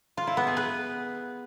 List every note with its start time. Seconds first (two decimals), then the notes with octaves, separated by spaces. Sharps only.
0.17 F4
0.27 E4
0.37 B3
0.47 G#4
0.57 B4